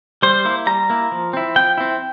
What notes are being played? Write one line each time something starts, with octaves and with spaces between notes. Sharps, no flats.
G3 C5
A#3 E4
G3 A#5
A#3 E4
F3
C4 E4
F3 G5
C4 E4